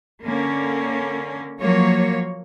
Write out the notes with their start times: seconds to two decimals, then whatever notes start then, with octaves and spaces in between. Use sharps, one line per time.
0.24 D3 A#3 C#4
1.59 F3 F#3 A#3 C#5